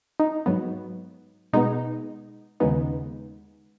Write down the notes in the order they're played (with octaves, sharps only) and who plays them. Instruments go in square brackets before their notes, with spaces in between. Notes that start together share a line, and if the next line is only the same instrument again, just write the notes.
[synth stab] D#4
G#2 F#3 B3
B2 G#3 B3 D#4
D#2 C#3 G#3 B3 D#4